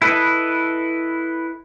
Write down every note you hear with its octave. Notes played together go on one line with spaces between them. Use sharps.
E4 A4 B4 D#5